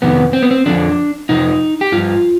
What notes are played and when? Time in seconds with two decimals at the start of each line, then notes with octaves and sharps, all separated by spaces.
0.02 F2 C3 D#3 B3
0.33 C4
0.42 B3
0.51 C4
0.66 F2 D3 F3 D4
1.29 F2 C3 F3 D#4
1.81 G4
1.92 G2 F3 F4